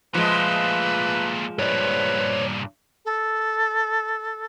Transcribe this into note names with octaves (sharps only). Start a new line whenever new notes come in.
A#2 F3 G#3 A3 B4
G2 A#2 B4 C#5 D5
A4